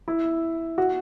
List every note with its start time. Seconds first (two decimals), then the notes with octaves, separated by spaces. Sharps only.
0.08 E4
0.78 F#4